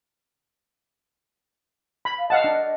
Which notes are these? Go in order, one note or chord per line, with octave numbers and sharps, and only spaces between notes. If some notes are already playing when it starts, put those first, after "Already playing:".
B5
F5
D#5 F5 F#5 A5
D4